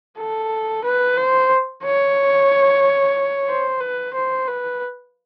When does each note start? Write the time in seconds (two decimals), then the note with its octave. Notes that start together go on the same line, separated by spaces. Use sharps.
0.18 A4
0.84 B4
1.17 C5
1.83 C#5
3.49 C5
3.80 B4
4.14 C5
4.47 B4